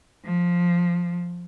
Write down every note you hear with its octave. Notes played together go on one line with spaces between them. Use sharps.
F3